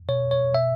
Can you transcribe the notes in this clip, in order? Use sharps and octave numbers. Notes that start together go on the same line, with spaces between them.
B2 C#5
C#5
B2 E5